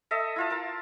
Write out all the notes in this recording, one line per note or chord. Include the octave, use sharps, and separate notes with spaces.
A4 D#5 E5
E4 F4 A5
A#4 A5